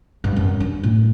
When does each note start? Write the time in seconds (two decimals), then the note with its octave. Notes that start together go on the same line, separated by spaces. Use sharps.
0.24 G2
0.36 F#2
0.60 D4
0.83 A2